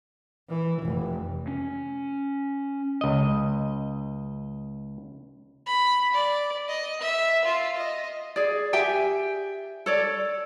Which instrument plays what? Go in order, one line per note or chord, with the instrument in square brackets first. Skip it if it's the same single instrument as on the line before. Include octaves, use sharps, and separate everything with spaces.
[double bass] E3
F1
[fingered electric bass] C#4
[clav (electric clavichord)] C#2 D#5
[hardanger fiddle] B5
D5
D#5
E5
F4
D#5
[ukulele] G#4 D5
G4 E5 G5 G#5
A4 C#5 D5